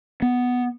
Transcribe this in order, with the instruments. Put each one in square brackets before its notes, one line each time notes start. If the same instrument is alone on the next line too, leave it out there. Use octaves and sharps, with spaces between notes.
[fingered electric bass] B3